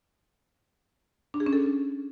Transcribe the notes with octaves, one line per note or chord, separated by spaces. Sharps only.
D4
G#4
C#4
A4